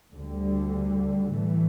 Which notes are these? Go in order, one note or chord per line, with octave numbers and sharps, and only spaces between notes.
D2 D3 G3
A2 E3 A3